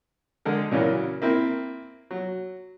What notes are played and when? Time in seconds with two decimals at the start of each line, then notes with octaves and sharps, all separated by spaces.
0.45 D3 G#3 A4 A#4
0.71 A#2 C#3 E3 F#3 A#3
1.22 A#3 C4 E4
2.11 F#3